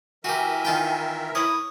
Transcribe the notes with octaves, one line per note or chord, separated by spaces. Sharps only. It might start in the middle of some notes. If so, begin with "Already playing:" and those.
E3 F#4 G4 A#4 E5 G#5
D#3 F4 G5
E4 C#5 D#6